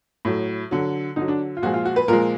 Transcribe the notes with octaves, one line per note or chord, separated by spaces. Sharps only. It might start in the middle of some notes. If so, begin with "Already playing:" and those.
A2 F#3
D3 F#3
D3 F#3 D#4
D4
F4
A#2 F3 G#3 F#4
F4
F#4
B4
A#2 F3 G#3 A#4